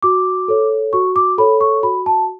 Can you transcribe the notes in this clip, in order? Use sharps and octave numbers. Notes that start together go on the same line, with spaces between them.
F#4 D6
A4 C#5
F#4 C#6
D6
A4 C#5 B5
C#6
F#4 B5
A5